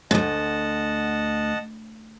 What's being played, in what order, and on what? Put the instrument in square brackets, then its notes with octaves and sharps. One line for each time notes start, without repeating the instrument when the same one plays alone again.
[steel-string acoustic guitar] D2 G#2 [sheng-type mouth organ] D#5 F#5 A5